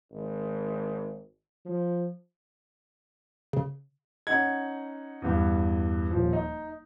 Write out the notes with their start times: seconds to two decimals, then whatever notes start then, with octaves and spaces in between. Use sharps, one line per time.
0.11 G#1
1.65 F3
3.53 C#3
4.27 C#4 D#4 F#5 G#6
5.22 E2 G2
6.11 D#1 F3
6.33 D#4